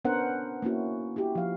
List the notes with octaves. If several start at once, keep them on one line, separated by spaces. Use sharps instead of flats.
B3 C#4 D4 A#4 C5 F#5
A#3 C#4 E4 F#4
E4 F#4 G4
F3 F5